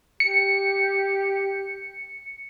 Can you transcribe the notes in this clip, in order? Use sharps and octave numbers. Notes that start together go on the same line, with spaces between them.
G4 C#7